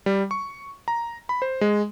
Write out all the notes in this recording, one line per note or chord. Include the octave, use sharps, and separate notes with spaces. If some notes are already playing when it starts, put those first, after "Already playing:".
G3
C#6
A#5
B5
C5
G#3